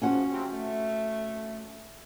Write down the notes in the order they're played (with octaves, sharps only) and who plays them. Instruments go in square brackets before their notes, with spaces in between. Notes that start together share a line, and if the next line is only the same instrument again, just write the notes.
[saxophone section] E2 G#2 F3 [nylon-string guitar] C#4 F#4 F#5
[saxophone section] C3 F3 C4
A3